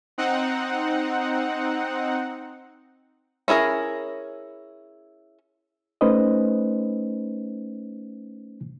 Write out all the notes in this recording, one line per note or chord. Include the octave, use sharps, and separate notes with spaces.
C4 D#4 F#5
C#4 E4 G#4 A#4
A3 C#4 D#4 B4 C5 D#5